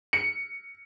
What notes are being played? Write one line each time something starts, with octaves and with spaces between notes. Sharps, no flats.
C#7